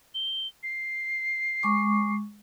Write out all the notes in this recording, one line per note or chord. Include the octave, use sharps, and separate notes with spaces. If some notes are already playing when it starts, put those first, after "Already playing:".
G7
C7
G#3 C#6 D6